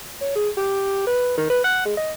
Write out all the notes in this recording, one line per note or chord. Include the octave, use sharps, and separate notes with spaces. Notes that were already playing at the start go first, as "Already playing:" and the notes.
C#5
G#4
G4
B4
D#3
B4
F#5
G#3
D#5